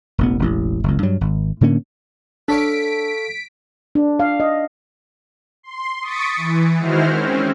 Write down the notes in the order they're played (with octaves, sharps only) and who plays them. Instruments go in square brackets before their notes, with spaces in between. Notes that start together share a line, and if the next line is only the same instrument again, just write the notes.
[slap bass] E1 A1 B3
E1 A1
F#1 C#2
G2 F#3
G#1
A2 D3 A#3 C#4
[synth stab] D4 [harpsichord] A4 C#5 F5 [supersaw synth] B6 D7
[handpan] D4
F5
D#5
[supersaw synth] C6
C#6 D#6 A6 B6 C#7 D7
E3
D#3 G#3 E4 F#4 C5 F6
C4 C#4